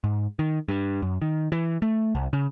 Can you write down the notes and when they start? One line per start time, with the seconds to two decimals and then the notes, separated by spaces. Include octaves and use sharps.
0.04 G#2
0.39 D#3
0.68 G2
1.02 F#2
1.22 D#3
1.52 E3
1.82 A3
2.15 C2
2.33 C#3